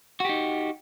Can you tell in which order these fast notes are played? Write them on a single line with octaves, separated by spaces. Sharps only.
F#4 G4 D#4